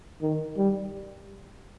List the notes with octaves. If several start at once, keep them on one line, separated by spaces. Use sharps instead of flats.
D#3
G3